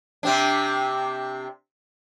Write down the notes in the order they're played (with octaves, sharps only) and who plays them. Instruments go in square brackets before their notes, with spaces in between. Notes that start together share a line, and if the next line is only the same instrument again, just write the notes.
[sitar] C3 C4 D4